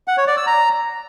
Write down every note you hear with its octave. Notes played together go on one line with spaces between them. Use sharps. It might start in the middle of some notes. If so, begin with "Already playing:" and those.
F#5
C#5
D5
E6
A#5